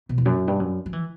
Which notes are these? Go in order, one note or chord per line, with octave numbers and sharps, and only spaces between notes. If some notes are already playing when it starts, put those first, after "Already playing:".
B2
E2
F#2
G2
F#2
F#3
E3